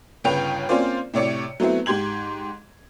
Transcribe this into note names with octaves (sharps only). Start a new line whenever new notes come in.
G1 C#3 B4 C#5 G5 F7
A#3 C4 C#4 F4 C5 D5
A2 C3 C#5 D5 C#7
F#3 A3 B3 C4 E4
G#2 G4 C6 G#6 F#7